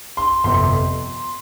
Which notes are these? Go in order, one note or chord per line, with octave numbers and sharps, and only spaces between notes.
C6
G1 F2 C3 C6